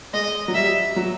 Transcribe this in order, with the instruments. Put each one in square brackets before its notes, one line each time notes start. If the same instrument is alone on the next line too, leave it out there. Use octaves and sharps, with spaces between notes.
[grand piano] G#3 [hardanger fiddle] D#5
[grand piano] F#3
[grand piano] G3 [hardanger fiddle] E5
[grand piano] F#3